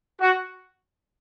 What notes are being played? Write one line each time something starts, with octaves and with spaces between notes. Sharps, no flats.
F#4